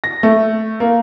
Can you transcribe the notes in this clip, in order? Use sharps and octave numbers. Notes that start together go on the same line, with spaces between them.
A#6
A3
A#3